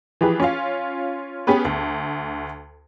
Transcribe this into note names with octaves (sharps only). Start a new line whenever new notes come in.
E3 F3 G4 G#4 B4
C#4 F4 F5
B3 C#4 G4 G#4 B4
D2